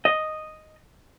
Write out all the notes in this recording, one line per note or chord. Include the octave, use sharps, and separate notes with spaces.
D#5